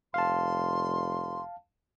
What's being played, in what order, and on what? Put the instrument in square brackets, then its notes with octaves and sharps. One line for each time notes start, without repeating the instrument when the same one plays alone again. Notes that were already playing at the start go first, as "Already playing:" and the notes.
[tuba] F1 [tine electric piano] F5 A5 [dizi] C6